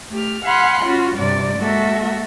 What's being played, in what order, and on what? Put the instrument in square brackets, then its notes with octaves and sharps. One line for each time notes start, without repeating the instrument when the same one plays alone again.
[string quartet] A3 G4 F6
F5 F#5 G#5 B5 C6 F#6
C#4 F4 F#4
G2 C3 D5
G#3 A#3 F#4 A4 E5